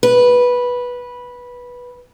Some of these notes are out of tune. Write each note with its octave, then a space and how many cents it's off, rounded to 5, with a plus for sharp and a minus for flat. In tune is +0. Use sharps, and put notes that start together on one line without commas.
B4 -10